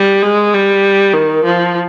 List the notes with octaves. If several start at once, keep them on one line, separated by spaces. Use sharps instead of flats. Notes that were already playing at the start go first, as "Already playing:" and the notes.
Already playing: G3
G#3
G3
D#3
F3